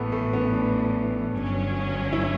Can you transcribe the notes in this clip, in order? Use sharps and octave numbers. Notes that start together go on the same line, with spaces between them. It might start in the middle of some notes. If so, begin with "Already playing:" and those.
Already playing: A1 A2 E3 A3 B3
A3
B3
D4
G1 G2 F#3 C#4
E4